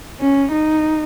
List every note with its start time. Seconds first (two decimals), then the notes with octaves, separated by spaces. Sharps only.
0.20 C#4
0.51 D#4